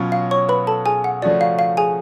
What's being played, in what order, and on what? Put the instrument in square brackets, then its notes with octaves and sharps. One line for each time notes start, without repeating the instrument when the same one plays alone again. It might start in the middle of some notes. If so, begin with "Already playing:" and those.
Already playing: [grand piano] B2 F#3 C#4 F4
[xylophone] F5
C#5 C#6
B4 B5
A4 A5
G#4 G#5
F#5
[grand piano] C#3 F3 A3 C#4 F#4 [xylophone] D5
[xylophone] F5
F5
G#4 G#5